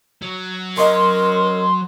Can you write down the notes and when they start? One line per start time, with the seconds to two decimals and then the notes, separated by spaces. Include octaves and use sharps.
0.22 F#3
0.77 C#4 A#4 D#5 C6